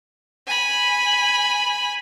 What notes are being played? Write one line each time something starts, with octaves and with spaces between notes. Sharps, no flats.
G#5 B5